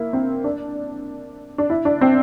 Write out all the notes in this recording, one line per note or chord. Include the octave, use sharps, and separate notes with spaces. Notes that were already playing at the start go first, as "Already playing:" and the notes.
Already playing: A#3 E4
C4
D4
D4
E4
D4
C4